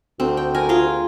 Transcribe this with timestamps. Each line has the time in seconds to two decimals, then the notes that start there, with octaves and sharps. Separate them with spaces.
0.20 D2 C4
0.37 G5
0.55 A#4 G#5
0.69 F4 G#4